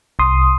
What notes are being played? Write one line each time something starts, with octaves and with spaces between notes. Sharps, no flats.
C2 C6 D#6